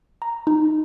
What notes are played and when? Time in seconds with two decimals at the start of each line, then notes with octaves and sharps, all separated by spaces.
0.22 A#5
0.47 D#4